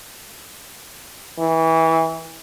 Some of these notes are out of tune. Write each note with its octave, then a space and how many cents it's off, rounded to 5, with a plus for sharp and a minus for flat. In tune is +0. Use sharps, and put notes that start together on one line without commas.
E3 -25